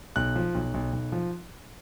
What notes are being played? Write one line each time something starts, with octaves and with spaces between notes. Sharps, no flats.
B1 F#6
F3
B1
B1
B1
F3